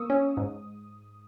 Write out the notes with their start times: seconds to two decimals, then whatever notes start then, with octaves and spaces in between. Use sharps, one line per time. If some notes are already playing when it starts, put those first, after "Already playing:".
Already playing: A#3 C#6 D#6 E6
0.10 C#4
0.37 G#2